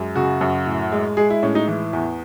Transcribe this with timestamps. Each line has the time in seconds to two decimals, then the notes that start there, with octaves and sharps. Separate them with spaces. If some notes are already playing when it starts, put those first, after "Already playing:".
Already playing: F#2 G#3
0.15 C#3 F#4
0.41 F#2
0.66 A2
0.92 G#3
1.17 G#3 G#4
1.30 E4
1.43 A2 C#4
1.55 D#4
1.68 E3
1.93 E2